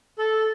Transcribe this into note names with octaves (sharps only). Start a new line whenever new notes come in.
A4